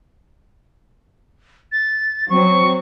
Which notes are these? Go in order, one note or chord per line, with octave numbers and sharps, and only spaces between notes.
A6
F#3 C4 C#6